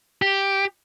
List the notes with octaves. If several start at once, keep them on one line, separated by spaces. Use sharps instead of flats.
G4